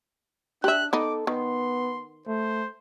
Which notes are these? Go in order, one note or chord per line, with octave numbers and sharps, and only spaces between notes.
D4 G4 E5 F#6
B3 D#4 A4 D6
D#3 B3 C6
A3 C5